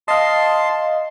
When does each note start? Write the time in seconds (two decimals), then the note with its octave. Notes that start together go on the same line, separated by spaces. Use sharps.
0.08 D#5 F5 A5 C6